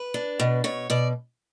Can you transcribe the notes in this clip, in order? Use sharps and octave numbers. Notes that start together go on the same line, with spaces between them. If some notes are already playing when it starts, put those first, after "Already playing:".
Already playing: B4
D4
B2
B2 C#5
B2 D5